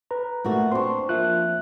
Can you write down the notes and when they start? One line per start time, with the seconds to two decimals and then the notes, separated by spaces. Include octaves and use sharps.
0.11 B4 A#5
0.44 A#2 A3 F#4
0.72 C4 D4 C6 C#6
1.09 F3 A#3 E5 F#6